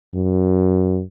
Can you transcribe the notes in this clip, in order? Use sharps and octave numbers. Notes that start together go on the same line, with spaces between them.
F#2